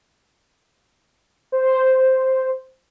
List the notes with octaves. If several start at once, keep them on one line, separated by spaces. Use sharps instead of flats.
C5